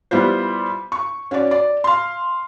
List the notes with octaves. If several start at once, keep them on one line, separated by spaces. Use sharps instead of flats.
G3 B3 E4 F4 C5
C#6
C#4 F#4 C#5 D5
D5
F5 C6